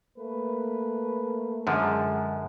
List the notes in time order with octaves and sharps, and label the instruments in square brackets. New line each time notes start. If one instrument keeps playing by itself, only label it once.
[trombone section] A3 A#3 B4
[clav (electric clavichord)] F#2 D3 F3 [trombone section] G#3